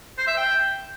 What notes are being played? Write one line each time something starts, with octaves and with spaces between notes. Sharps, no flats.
C5
E5
G5